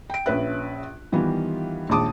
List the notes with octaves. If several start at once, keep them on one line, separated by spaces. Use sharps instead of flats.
G5 D7
A#1 C#4 B4 E5 F#6
D#3 E3 G3 B3 F4
A#1 D#2 G#3 A5 D6 D#6